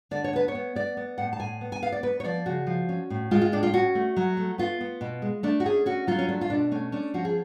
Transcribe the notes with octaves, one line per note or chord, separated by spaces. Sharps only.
D3 D5
C#5
B3 B4
C#5
B3
B3 D5
B3
A2 F#5
A5
A2 G#5
B3
G#5
B3 F5
D5
B3 B4
C#5
F3 D5
C#3 F#4
F3
C#4
A2
G#3 F4
F4
A2 D4
F4
C#4 F#4
A3
F#3
A3
B3 F4
B3
B2
G#3
A3 D4
F#4
C#4 G#4
C#4 F#4
F#3 F4
C#4
A3 D4
F4
B2 D4
A3 C#4
C#4 D4
F3 F#4
G#4